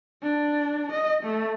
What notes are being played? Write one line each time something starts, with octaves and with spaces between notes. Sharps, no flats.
D4
D#5
A3